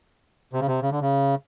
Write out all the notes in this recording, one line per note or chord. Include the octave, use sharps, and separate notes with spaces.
C3
C#3
C3
C#3
D3
C#3